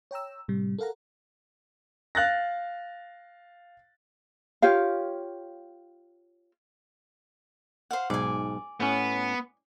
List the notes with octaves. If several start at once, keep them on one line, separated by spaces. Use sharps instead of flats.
C#5 G5 A#5 E6
A2 C3 G3
A4 A#4 F5 F#5 A#5
F5 F#6 A6 A#6
F4 G4 C#5 F5
C5 F5 F#5
B1 G#2 D5 G#5
A2 B3 C#4